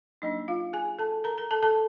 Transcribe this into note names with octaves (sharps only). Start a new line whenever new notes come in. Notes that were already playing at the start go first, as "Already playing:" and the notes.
F#3 A#3 D4 D#4 D#5
F4 F5
G#4 G#5
A4 A5
A#4 A#5
A#4 A#5
A4 A5
A4 A5